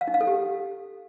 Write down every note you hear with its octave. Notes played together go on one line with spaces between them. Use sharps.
F5
D#4
F5
A4
G4